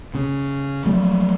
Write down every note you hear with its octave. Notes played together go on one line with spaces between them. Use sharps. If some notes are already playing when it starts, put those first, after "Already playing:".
C#3
F3 F#3 A3